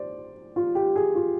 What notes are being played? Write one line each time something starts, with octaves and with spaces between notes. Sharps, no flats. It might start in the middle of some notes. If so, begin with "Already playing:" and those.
Already playing: C5 D5
F4
G4
G#4
F4